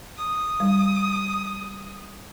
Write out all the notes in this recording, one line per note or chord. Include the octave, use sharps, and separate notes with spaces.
D#6
G3